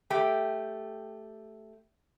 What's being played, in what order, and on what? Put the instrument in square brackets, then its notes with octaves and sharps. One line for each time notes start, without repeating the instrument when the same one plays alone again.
[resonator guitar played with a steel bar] A3 G4 G5